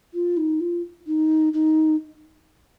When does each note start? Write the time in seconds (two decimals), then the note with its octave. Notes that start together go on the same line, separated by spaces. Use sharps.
0.14 F4
0.37 D#4
0.60 F4
1.07 D#4
1.54 D#4